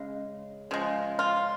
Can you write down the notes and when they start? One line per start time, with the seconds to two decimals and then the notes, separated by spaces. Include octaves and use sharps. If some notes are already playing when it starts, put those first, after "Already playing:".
Already playing: C#3 G#3
0.71 C#3 F3 G#3
1.19 F4